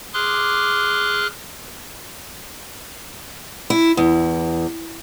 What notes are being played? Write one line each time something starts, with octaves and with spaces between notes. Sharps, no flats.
G#4 C6 D6 F6 F#6
E4
E2